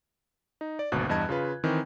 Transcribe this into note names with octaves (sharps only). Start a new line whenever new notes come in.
D#4
D5
G#1 D2 B2 F#6
E2 G2 D#5 A5 F#6 G#6
C#3 F4 B4
D#3 E3 C4